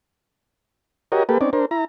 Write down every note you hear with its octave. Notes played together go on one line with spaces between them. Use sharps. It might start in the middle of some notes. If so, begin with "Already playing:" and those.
F#4 G4 A#4 C#5 D#5
A#3 G4 A4 B4
C4 C#4 D#4 D5
D4 A#4 C5
E4 A#5